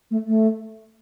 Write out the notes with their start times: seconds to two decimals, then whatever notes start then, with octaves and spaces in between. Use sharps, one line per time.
0.10 A3
0.26 A3